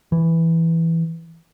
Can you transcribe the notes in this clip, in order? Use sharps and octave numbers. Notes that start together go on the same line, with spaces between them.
E3